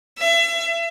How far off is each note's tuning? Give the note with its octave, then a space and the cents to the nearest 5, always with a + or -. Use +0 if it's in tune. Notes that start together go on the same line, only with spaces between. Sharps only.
E5 +30